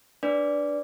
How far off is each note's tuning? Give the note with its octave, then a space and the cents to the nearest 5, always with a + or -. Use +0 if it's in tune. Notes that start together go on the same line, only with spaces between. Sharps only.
D4 +0 B4 +0 D5 -15